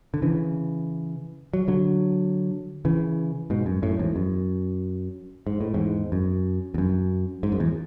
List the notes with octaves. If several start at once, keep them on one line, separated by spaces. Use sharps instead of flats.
D3
C#3 E3
F#3
D3 F#3
C#3 E3
G#2 B2
F#2
F#2 A2
E2 G#2
F#2
G#2
A2
E2 G#2
F#2
E2
F#2
G#2
F#2
E2